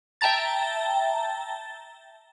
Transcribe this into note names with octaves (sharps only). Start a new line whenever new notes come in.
E5 G5 A5 A#5 A6